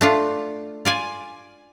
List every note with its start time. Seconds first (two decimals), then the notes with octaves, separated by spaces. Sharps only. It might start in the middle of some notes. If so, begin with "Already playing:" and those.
0.01 A3 D4 F4
0.85 F4 D5 G#5